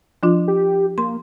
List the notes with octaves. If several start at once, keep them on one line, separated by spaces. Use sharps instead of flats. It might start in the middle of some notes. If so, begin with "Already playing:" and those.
F3 D4 F4
G4
A#3 C6